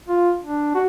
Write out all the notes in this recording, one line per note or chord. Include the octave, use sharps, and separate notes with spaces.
F4
D4
F#4